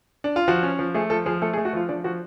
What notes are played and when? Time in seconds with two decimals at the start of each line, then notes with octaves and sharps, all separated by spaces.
0.24 D4
0.36 F4
0.48 F3 F#4
0.63 C#4
0.79 F3
0.94 A3 G#4
1.10 F3 A4
1.26 F3 G#4
1.42 A3 A4
1.53 G#4
1.57 A3
1.65 F#4
1.73 F3 F4
1.89 F3 D4
2.04 F3 F#4